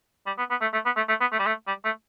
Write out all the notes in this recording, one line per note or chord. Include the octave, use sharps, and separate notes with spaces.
G3
B3
B3
A3
A3
B3
A3
A3
B3
A3
G3
A3
G3
A3